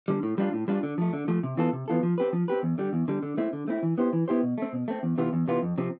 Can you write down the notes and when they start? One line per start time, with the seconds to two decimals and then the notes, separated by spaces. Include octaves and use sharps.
0.08 D3 G3
0.23 A2
0.38 G3 D4 F4
0.53 A2
0.68 G3 D4 F4
0.83 D3
0.98 F3 A3
1.13 D3
1.28 F3 A3
1.43 C3
1.57 E3 B3 F4 A4
1.73 C3
1.88 E3 B3 F4 A4
2.03 F3
2.18 C4 G4 B4
2.33 F3
2.48 C4 G4 B4
2.63 E2
2.78 D3 G3
2.93 E2
3.08 D3 G3
3.23 D3
3.37 A3 C4 E4
3.53 D3
3.68 A3 C4 E4
3.83 E3
3.98 B3 E4 G4 C5
4.13 E3
4.28 B3 E4 G4 C5
4.43 B2
4.58 A3 C4
4.73 B2
4.88 A3 C4
5.03 E2
5.18 C3 E3 B3 F4
5.33 E2
5.48 C3 E3 B3 F4
5.62 F2
5.78 C3 F3 C4